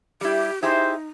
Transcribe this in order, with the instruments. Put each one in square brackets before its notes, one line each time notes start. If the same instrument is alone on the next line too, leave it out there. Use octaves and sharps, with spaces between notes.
[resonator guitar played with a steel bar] G3 E4 [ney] G4
[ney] D#4 [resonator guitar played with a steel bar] E4 G4 G#4 [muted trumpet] C5